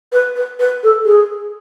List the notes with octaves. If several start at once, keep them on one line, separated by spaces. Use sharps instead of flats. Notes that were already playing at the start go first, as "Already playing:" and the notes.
B4
B4
B4
A4
G#4